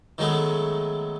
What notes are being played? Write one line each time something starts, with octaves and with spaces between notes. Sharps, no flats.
D#3 F#3 G#3 A3 B3